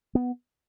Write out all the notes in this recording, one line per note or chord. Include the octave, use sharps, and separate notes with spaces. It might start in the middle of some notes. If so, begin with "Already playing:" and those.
B3